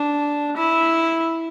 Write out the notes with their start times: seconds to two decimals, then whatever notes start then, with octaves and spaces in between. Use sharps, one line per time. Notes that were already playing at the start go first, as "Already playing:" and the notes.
Already playing: D4
0.57 E4